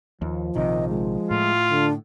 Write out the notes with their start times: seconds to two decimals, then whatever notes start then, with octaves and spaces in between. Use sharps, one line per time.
0.22 D#2 F3
0.56 A#1 C3 D#3 D#5
0.89 G#3
1.31 A2 F4
1.70 D3 D4